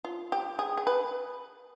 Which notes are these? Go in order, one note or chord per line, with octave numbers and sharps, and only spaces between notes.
F4
G4
G#4
G#4
B4